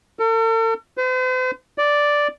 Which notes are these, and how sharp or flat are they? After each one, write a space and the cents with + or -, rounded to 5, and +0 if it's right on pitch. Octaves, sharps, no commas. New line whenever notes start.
A4 +45
C5 -45
D5 -5